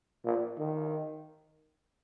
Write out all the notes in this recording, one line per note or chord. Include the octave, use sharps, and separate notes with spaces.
A#2
D#3